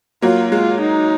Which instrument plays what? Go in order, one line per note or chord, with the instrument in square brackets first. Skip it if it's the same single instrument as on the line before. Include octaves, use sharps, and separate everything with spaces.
[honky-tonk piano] F#3 A#3 [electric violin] F4
[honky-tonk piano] G#3 [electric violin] F4
[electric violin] D#4